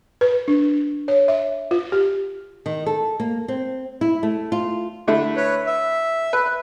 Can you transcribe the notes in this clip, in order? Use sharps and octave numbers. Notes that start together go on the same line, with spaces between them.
B4
D4
C#5
E5
F4
G4
D#3
A4
A#3
C4
E4
A3
F4
D3 A3 E4
B4 C#5
E5
B4